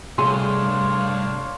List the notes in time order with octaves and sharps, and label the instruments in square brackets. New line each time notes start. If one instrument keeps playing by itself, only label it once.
[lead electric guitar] G2 [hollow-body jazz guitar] C3 A3 G#4 [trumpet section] D4 C#5 F5 [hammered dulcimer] C6